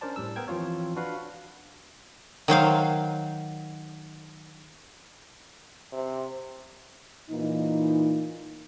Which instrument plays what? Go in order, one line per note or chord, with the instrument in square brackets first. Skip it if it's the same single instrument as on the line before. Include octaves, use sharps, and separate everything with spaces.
[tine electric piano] C#4 D4 A#4 C5 D5 A5
A2 G3 E6
B3 A#4 G5 G#6
E3 F3 C4 F4 C#5
D4 F#4 B4 F5
[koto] D#3 F#3 C5 F5
[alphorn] C3
[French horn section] A#2 E3 A#3 D#4